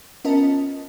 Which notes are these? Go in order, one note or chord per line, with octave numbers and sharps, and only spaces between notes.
B3 C#4 F4 A#4 D#5 A5